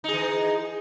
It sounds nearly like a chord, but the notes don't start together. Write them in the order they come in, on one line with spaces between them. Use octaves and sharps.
D#4 G#4 E3